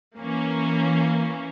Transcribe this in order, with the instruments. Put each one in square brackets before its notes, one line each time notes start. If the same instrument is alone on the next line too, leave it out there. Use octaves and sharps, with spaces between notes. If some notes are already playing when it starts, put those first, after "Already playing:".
[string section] E3 A#3 C#4